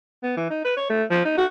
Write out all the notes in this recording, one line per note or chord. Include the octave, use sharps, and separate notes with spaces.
B3
E3
D#4
B4
C#5
A3
F3
D#4
F#4